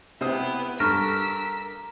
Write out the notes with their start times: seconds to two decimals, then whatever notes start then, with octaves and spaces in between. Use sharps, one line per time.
0.21 C3 B3 E4 C5 D#6
0.80 G2 A4 A#4 C#6 E6 F6 B6